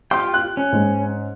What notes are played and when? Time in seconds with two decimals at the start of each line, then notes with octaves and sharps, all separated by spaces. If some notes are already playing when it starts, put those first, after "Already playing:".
0.11 F4 G4 G5 C6
0.34 F#6
0.57 C#4
0.73 G#2